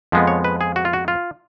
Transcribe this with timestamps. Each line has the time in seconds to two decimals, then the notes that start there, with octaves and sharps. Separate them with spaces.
0.12 F2 F3 G#3 B3
0.27 C#5
0.44 B4
0.61 G#4
0.76 F#4
0.85 F4
0.93 F#4
1.08 F4